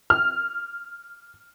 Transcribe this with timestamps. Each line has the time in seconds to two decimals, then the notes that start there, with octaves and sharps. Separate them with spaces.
0.10 F6